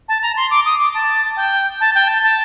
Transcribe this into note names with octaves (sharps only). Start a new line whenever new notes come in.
A5
A#5
C6
D6
D#6
D6
A5
G5
A5
G5
A5
A5